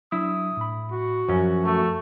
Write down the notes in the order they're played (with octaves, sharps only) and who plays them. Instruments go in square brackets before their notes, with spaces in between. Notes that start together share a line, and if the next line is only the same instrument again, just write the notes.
[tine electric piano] F#3 D4 E6 [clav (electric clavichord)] E4 [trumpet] D#6
[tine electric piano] A2 B5
[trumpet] F#4
[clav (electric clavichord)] F#2 C#4 [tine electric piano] F3
[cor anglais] A3 [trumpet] F#4